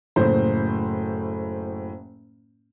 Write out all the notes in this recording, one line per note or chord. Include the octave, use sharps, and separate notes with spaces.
F#1 A2 C5